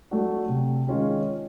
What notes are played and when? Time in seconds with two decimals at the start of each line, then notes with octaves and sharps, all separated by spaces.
0.11 F#3 A3 D4 F#4
0.49 C3
0.87 D#3 G#3 C#4 F4